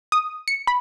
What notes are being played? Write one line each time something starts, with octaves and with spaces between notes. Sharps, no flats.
D#6
C#7
B5